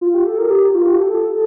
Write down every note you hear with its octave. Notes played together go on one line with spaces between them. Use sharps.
F4
G4
A4
A#4
G4
G4
F4
G4
A4